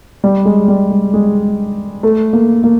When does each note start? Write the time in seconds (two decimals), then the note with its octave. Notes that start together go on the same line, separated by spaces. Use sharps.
0.24 G3
0.45 G#3
0.68 G3
0.90 G#3
1.14 G#3
2.03 A3
2.33 A#3
2.64 A#3